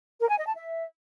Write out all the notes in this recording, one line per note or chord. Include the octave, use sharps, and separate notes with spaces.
A#4
G#5
D#5
A5
E5